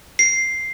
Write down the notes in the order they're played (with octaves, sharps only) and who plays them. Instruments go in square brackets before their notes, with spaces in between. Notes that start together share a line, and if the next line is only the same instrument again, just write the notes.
[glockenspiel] C7